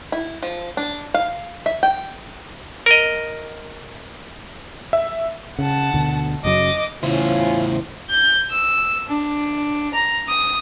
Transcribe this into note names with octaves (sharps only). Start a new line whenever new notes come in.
E4
F3
D4
F5
E5
G5
A#4 D#5
E5
C#3 F#5 A5
D2 B2 D3
F#1 C#3 F#3 D#5 D6
E2 A2 C#3 C#4 E4 F4 C5
G6
E6
D4
A#5
D#6